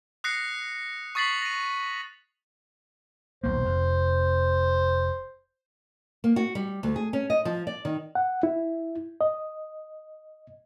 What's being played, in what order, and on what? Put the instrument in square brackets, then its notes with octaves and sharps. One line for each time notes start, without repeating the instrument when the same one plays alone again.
[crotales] D#6 F#6 A#6 C7 C#7
C#6 D#6 A6 B6 C7 F#7
A#6 D#7
[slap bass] D#1 B1 A#3 [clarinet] C5
[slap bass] F1 F2
[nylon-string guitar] A#3
F#4
G3
D2
G#4
C#4
D#5
F3
D5
D#3
[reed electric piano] F#5
E4
D#5